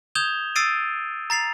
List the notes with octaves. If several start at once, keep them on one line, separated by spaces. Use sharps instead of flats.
D#6 G6 G#6 E7 F7 G7
D#6 E6 A6 C7 D7 D#7
A#5 A6 C7 F7